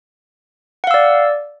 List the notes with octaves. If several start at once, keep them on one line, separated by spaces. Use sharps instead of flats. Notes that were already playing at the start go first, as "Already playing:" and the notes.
D5 F5 F#5 E6